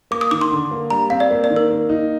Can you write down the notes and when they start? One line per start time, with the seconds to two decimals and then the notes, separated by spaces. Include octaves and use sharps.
0.11 A#3 D6
0.21 D#6
0.31 D#3 D6
0.41 C6
0.51 D3
0.71 A#3
0.90 G3 A#5
1.10 C4 F5
1.20 D5
1.31 A#3
1.44 D5
1.50 D#3
1.56 A#4
1.70 A#3
1.89 D#4